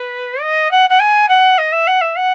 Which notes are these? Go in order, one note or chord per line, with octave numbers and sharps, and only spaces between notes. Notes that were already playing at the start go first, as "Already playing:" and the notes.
Already playing: B4
D#5
F#5
F#5
G#5
F#5
D#5
E5
F#5
E5
F#5